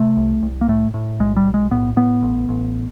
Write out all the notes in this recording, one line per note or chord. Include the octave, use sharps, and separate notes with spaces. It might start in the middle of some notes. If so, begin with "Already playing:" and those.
Already playing: C3 A3
C2
C2
A#3
A2 A3
A2
B1 G#3
G3
B1
G#3
A2 B3
A2 B3
A1
A1